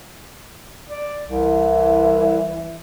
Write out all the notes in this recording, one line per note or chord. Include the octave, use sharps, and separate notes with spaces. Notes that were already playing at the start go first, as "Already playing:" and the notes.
D5
C2 E3